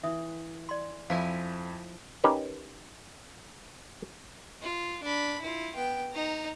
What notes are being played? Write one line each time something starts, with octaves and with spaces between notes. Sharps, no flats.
E3 E5 D#6
D5 C6
F2 F3 E4 F5 G#5 B6
C#4 D#4 G4 A#4 B4
F4
D4 B5
E4 F4
B3 G5
D#4 A#5